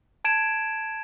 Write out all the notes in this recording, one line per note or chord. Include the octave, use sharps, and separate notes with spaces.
A5 G#6 D7 E7